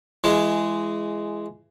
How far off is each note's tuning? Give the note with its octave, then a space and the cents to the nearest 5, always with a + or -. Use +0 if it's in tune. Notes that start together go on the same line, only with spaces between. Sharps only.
E3 +25 G#3 +0